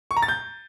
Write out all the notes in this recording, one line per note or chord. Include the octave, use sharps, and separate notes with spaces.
C#6
A#5
A6
G6